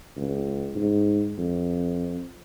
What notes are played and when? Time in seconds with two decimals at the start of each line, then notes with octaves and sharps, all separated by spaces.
0.16 C#2
0.75 G#2
1.37 F2